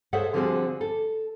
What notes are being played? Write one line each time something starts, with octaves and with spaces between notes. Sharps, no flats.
G#4 A4 C5 C#5 E5 F#5
D3 F3 G3 C4 F#4 G#4
A4